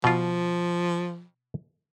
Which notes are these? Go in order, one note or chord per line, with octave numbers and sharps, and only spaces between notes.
B2 F3 F4